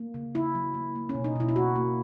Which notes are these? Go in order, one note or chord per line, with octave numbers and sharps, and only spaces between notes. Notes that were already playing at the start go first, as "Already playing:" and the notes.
Already playing: A#3
C#3
C#3 E4
F#3
A#3
A#3
C#4
B2
D#4
B2 E4
E4
A#3 F#4
A#3